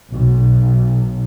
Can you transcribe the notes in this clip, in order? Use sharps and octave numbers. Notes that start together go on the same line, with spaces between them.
B1